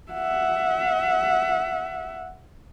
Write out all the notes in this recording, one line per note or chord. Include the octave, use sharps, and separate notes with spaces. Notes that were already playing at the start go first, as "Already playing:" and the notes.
E5 F#5